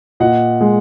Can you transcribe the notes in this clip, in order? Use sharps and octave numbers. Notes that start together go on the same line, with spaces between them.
A#2 D#5 F#5
G#3